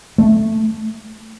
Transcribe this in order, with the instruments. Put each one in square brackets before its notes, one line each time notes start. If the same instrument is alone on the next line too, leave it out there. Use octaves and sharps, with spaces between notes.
[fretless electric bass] A3